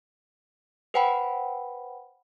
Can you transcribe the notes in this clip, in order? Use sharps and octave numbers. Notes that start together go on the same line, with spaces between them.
B4 C5 F#5 G5 A5 B5